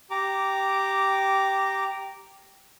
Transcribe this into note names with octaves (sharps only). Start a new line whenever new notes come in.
G4 A#5 D6